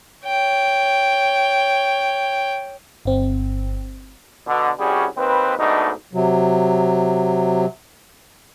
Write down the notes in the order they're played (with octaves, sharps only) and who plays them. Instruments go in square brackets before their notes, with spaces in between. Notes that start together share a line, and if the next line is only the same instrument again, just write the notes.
[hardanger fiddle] C#5 G5
[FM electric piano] G1 C4
[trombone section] B2 D3
C2 G3 C#4 F#4 G#4
D#2 C4 B4
G#2 B2 A3 D4 D#4
[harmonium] C3 F#3